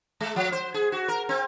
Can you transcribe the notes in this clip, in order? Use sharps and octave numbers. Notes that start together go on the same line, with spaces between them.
G#3
F3
C5
G#4
F#4
A#4
C4